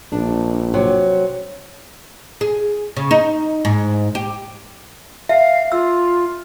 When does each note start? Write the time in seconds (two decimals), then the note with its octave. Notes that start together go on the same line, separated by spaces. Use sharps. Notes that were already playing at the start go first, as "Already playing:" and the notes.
0.12 A#1 D4
0.74 C3 F#3
2.41 G#4
2.96 C#3
3.11 D#4
3.65 G#2
4.15 G4
5.29 E5 F5
5.72 F4 E6